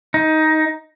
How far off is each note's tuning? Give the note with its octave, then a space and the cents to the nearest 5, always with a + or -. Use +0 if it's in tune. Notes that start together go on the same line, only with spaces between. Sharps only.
D#4 +15